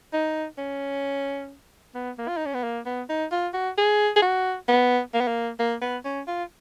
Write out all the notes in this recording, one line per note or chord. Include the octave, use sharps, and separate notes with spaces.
D#4
C#4
B3
A#3
F4
D#4
C#4
B3
A#3
B3
D#4
F4
F#4
G#4
G#4
F#4
B3
A#3
B3
A#3
A#3
B3
C#4
F4